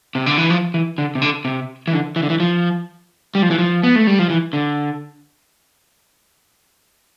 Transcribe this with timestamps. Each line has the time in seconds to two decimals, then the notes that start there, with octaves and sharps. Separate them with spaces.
0.15 C3
0.26 D3
0.38 E3
0.50 F3
0.74 E3
0.98 D3
1.15 C3
1.22 D3
1.45 C3
1.88 E3
1.92 D3
2.16 E3
2.23 D3
2.30 E3
2.40 F3
3.35 G3
3.42 F3
3.51 E3
3.58 F3
3.84 B3
3.96 A3
4.07 G3
4.19 F3
4.30 E3
4.53 D3